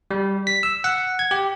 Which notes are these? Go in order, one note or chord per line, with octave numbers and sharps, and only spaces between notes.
G3
B6
E6
F#5
G#6
G4